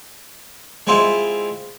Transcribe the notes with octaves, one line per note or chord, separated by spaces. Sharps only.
G#3 C4 E4 F4